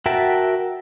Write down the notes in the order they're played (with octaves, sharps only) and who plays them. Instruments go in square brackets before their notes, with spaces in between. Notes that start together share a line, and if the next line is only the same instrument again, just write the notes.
[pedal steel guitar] F#4 A#4 E5 G5 A5